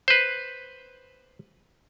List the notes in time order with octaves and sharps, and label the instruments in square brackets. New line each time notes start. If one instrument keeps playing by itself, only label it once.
[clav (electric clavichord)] B4 C5